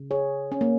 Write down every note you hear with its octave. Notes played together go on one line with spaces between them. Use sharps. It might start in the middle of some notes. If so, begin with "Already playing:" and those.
Already playing: C#3
G#4 C#5
C#4
A#3